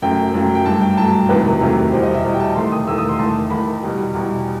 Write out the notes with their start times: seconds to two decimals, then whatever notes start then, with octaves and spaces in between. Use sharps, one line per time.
0.02 F#2 F#3 A3 G5
0.34 F#2 F#3 A3
0.55 G5
0.65 G2 F#3 A3 A5
0.81 G5
0.97 G2 F#3 A3 A5
1.29 E2 C3 D#3 F#3 A3 B4
1.61 E2 C3 D#3 F#3 A3
1.92 E2 B2 G3 C5
2.03 D#5
2.14 E5
2.24 E2 B2 G3
2.34 G5
2.40 A5
2.56 E2 D#3 A3 C6
2.72 D#6
2.87 E2 D#3 A3 E6
2.98 D#6
3.09 C6
3.19 E2 D#3 A3 A5
3.50 E2 D#3 A3 B5
3.82 E2 B2 G3
4.14 E2 B2 G3